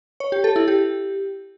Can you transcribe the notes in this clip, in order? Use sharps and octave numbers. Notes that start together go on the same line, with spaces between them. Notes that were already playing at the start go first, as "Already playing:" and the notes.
C#5
G4
A4
E4
G4